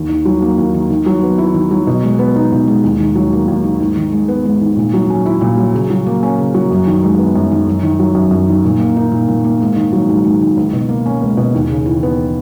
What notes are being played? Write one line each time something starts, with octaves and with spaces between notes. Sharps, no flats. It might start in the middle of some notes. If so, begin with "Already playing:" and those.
Already playing: D#2
D#3
F#3
A#3
D#2
D#3
D#3
F#3
B3
E4
D#3
F#3
B2
G#3
B3
D#4
B2
G#3
D#2
D#3
F#3
A#3
D#2
D#3
G#2
D#3
G#3
B3
G#2
D#3
A#2
F#3
C#4
E4
A#2
F#3
C#3
F#3
A#3
C#4
C#3
F#3
F#2
D#3
G#3
B3
F#2
D#3
F#2
D#3
F#3
F#2
F#2
D#3
A#2
A#3
D#4
A#2
A#2
A#3
G#2
D#3
F#3
G#2
G#2
D#3
C#2
B2
A#3
C#4
C#2
B2
D#2
C#3
E3
B3